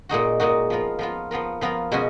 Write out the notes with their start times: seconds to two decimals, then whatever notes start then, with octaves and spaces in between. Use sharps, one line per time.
0.09 A#2 G#3 D#4 F#4
0.40 A#2 G#3 D#4 F#4
0.70 F3 B3 F4 A#4
0.99 F3 B3 F4 A#4
1.31 F3 B3 F4 A#4
1.61 F3 B3 F4 A#4
1.92 B2 G#3 C#4 F#4